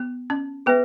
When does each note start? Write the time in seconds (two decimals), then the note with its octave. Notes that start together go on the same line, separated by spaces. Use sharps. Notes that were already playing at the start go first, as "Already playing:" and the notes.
Already playing: B3
0.30 C#4
0.66 B3 G#4 B4 E5